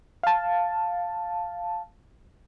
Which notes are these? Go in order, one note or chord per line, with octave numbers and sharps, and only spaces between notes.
F5 A5